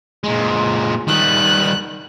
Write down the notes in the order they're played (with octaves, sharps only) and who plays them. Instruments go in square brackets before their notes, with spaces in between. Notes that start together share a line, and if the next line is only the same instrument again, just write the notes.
[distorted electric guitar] A#2 G#3
[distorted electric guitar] D#3 G3 [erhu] F#6